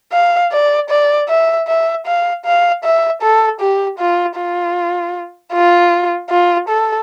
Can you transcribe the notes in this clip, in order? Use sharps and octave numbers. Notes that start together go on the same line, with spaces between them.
F5
D5
D5
E5
E5
F5
F5
E5
A4
G4
F4
F4
F4
F4
A4